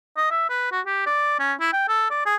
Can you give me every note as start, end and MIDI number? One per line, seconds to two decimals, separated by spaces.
0.17 0.28 75
0.31 0.45 76
0.49 0.71 71
0.72 0.81 66
0.86 1.04 67
1.06 1.38 74
1.39 1.54 61
1.60 1.69 64
1.73 1.87 79
1.88 2.06 69
2.10 2.22 74
2.26 2.36 68